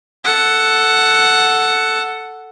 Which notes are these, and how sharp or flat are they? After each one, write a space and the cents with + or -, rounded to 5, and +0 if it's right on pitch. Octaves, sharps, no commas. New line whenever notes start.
A4 +0 F#5 +0